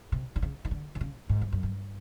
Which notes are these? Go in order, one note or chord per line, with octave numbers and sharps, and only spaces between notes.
C3
D3
C#3
D#3
D3
D3
C#3
G#2
G2
F#2
G2